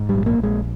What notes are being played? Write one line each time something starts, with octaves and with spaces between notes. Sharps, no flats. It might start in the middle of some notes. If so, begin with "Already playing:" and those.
Already playing: G#2
G3
A#1
A#3
A#1
G#3